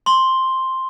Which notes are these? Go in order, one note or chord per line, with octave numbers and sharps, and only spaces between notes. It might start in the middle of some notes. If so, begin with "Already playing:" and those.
C6 G7